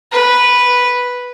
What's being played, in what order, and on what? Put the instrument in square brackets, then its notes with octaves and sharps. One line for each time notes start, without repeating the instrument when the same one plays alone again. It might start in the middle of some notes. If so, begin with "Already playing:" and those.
[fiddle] B4